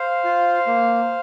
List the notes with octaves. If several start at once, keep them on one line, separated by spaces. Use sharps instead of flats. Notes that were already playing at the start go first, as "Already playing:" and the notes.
Already playing: C5 F5
F4
A#3